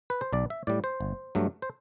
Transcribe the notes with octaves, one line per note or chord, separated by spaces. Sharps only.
B4
C5
B1 D5
E5
A2 G3 D5
C5
G1
G2 F#3 A3
C5